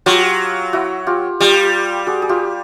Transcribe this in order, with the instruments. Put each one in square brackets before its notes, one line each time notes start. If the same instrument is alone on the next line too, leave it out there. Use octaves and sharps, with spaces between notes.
[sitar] F#3 [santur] F4 G4
[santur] E4 F#4
F4 G4
[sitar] G3 [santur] F4 G4
[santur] F#4 G#4
G#4
F4 G4